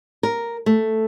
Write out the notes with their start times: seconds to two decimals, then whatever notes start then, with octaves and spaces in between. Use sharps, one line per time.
0.23 A#4
0.66 A3